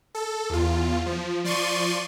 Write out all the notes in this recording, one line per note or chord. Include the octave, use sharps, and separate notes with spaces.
A4
E2 F4
F3
F3 D5 C6 C#6 D#7